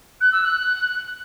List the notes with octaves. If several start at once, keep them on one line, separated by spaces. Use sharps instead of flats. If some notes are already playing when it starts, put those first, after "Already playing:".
F#6
E6
F#6